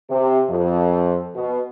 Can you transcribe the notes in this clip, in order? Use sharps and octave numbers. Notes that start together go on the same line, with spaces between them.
C3
F2
B2